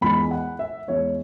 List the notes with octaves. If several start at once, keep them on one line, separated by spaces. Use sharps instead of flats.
E2 E3 G#3 B5
F#5
E5
E2 E3 G#3 C#5